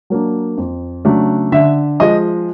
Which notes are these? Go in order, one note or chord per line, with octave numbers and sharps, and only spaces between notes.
F#3 A#3 D4
F2
C#3 F#3 A3 D4
D3 E5
F3 G#3 D#5